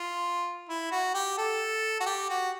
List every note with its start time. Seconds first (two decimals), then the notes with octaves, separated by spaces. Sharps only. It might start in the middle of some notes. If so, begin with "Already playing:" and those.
Already playing: F4
0.69 E4
0.91 F#4
1.15 G4
1.38 A4
2.00 F#4
2.06 G4
2.29 F#4